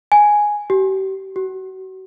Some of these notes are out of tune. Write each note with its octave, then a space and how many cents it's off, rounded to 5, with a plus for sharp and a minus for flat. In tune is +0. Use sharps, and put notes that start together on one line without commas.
G#5 +5
G4 -40
F#4 +35